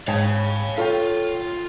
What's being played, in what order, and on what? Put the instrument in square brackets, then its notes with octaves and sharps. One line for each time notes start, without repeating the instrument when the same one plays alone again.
[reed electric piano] G#2 G5 A5 [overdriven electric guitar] C#5 F5
[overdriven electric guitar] F4 [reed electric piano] A4 C#5 G5